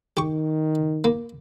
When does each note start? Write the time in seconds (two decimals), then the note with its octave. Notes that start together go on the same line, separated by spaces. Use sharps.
0.17 D#3 G4 C#6
1.04 A#3